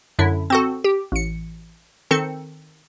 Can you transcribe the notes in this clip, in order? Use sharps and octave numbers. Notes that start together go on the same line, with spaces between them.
F#2 D3 E4
C4 F#4 A4
G4
A1 C#7
D#3 C4 A4 C#7